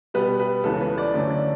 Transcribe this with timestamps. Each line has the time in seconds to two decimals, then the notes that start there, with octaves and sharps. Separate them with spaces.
0.14 B2 G3 B3 B4
0.40 B4
0.64 C#2 C#3 E3 B3 A4
0.81 B4
0.98 D5
1.14 F#2 D3 A3 C#4
1.30 D5